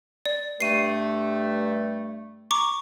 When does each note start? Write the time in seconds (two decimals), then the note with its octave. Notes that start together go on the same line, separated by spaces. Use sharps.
0.26 D5
0.60 G2 A3 C7 D#7
2.51 A#5 C#6 D6